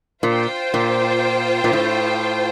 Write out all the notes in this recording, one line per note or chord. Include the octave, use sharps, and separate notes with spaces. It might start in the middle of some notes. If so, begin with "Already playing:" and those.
A#2 F4 C5 G5
A#2
A#2
A2